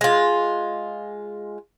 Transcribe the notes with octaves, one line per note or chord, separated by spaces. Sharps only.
G#3 F4